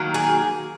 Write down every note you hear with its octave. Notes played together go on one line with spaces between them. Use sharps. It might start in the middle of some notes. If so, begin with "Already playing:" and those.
Already playing: D#3 F#3 A#3
G#4